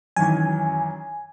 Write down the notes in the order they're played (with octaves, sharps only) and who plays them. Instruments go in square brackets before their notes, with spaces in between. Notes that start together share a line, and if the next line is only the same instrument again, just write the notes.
[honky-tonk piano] F#2 D#3 E3 [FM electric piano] G#5